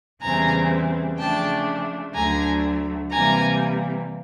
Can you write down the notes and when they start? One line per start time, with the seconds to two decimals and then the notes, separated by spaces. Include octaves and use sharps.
0.21 E2 C#3 E3 G3 C4 G#5 A#5
1.18 C#3 F3 A3 D4 G5 A5
2.14 D2 D3 F#3 A3 G#5 A#5
3.11 C3 E3 G3 A#3 G#5 A#5